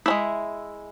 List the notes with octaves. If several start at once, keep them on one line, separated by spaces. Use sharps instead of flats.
G#3 C#4 E4 E5